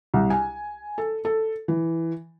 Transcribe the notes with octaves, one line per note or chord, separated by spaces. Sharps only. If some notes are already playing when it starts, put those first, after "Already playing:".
C2
G#5
A4
A4
E3